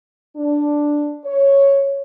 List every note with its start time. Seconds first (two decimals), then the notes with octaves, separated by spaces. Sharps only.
0.37 D4
1.25 C#5